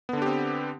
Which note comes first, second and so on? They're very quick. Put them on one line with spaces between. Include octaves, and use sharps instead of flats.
B3 D3 D4 G4 C4